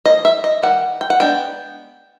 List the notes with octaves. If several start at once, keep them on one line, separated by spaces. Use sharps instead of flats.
F3 A#3 D#5
E5
D#5
D#3 G3 F#5
G5
F#5
G#3 B3 D4 G5